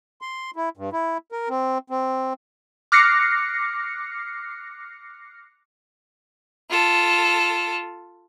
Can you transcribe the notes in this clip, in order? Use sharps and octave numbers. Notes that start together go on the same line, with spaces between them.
C6
E4
G2
E4
A#4
C4
C4
D6 F6 F#6 A#6 C7 C#7
F4 A4